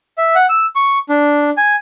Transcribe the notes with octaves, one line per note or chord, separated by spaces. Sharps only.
E5
F#5
E6
C#6
D4
G#5